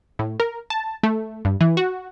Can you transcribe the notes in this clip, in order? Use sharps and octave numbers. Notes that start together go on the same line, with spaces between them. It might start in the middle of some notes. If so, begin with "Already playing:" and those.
A2
A#4
A5
A3
G2
E3
F#4